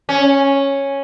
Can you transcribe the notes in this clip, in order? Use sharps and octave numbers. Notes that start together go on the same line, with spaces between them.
C#4